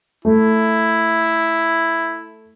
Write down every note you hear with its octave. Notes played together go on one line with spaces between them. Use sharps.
A3 E4